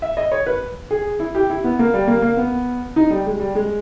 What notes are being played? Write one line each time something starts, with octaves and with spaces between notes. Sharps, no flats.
E5
D#5
C#5
B4
G#4
E4
G4
E4
B3
A#3
G3
A#3
A#3
B3
D#4
G3
G#3
G3
G#3